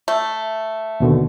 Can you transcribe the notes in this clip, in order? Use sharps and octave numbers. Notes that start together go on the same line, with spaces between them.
A3
D#2 B2 D3